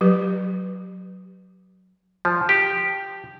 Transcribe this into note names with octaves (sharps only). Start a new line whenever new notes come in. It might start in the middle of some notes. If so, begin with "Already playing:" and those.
F#3 G4 B4
F3
G4